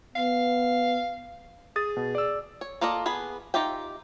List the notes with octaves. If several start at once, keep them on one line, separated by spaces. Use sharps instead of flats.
B3 F5
G#4 D#6 A6
B2
D5 E6
C#5
A#3 F4 A4 D5 D#5
B3 G#4 B5
D#4 F4 G4 E5 G5